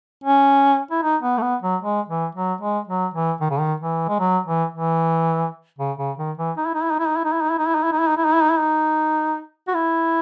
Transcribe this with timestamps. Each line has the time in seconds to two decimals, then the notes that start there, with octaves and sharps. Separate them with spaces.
0.24 C#4
0.91 E4
1.03 D#4
1.22 B3
1.38 A3
1.42 B3
1.62 F#3
1.82 G#3
2.08 E3
2.35 F#3
2.61 G#3
2.88 F#3
3.14 E3
3.41 D#3
3.50 C#3
3.60 D#3
3.80 E3
4.09 G#3
4.20 F#3
4.46 E3
4.72 E3
5.78 C#3
5.98 C#3
6.18 D#3
6.38 E3
6.57 D#4
6.66 E4
6.74 D#4
6.83 E4
6.91 D#4
6.99 E4
7.08 D#4
7.17 E4
7.25 D#4
7.33 E4
7.42 D#4
7.50 E4
7.59 D#4
7.67 E4
7.75 D#4
7.84 E4
7.92 D#4
8.00 E4
8.09 D#4
8.17 E4
8.25 D#4
8.34 E4
8.43 D#4
8.51 E4
8.59 D#4
9.68 F#4
9.74 E4